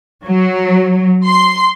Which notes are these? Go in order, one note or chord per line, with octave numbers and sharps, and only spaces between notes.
F#3
C6